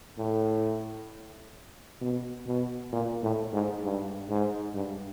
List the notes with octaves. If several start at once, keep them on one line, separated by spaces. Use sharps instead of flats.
A2
B2
B2
A#2
A2
G#2
G2
G#2
G2